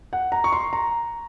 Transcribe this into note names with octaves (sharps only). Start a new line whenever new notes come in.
F#5
A#5
C#6
C6
A#5